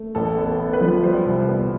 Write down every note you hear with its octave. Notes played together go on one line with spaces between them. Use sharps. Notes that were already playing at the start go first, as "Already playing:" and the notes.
Already playing: A3
A1 A4
B3
A4
B3
B4
F3
G3 C5
C2
B3